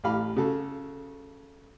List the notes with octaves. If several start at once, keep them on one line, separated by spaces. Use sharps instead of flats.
A1 A2 G4 F5 B5
C#3 F#4 A4